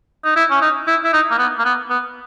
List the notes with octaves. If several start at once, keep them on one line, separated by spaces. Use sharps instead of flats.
D#4
E4
C#4
D#4
E4
E4
D#4
A#3
B3
A#3
B3
B3